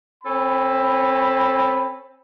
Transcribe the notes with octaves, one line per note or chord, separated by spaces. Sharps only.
C4 C#4 A4 B5